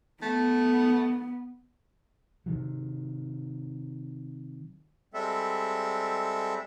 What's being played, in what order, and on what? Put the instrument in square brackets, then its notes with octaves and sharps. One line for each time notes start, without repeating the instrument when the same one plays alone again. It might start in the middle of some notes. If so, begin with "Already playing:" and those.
[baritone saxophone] A3 [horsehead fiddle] B3
[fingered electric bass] C3 D#3 F#3
[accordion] G3 G#3 C4 A4 E5